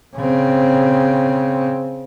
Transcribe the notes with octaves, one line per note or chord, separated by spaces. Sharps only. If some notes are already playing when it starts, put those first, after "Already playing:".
C#3 C4